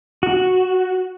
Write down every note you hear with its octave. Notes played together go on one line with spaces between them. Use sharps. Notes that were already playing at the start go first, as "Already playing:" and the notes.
F#4